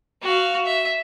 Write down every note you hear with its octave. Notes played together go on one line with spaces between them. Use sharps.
F#4 F5
E5